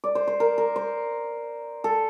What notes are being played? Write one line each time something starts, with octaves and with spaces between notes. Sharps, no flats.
D5
C5
C5
A#4
A#4
C5
A4